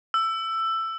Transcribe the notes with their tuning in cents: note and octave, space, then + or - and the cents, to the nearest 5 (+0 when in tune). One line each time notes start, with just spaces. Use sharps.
E6 +15